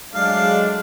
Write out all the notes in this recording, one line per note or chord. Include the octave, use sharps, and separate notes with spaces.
F#3 G#3 A3 D4 F5